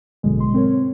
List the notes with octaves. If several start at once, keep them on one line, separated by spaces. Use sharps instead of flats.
A1 G2 B2 D3 F#3 G#3
C6
C4 A#4 C#5